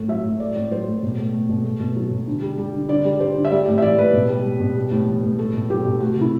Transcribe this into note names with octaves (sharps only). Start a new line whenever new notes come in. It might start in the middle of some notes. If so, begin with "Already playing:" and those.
Already playing: A2 A3
F#3 E5
A2
A3 D5
A2
F#3 C5
A2
B2
A3
A3
B2
A3
B2
F#3
B2
D3
G3
G3
D3
D3 D5
G3
G3 C5
D3
E5
G3 D5
A2
E5
E3 D5
A2 B4
B2
G3
G3
B2
G3
A2
E3
A2
A3 A4
B2
F#3 G4
B2
A3 F#4
C3
E4